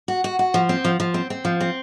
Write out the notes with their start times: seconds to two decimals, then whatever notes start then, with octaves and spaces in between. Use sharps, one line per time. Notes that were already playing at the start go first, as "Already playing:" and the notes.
0.08 F#4
0.24 F#4
0.39 F#4
0.54 F3
0.69 C4
0.85 F3
1.00 F3
1.14 C4
1.30 C4
1.45 F3
1.61 C4